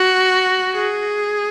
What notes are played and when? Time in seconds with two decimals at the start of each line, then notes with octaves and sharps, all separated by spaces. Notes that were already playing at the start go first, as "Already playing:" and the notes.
Already playing: F#4
0.74 G#4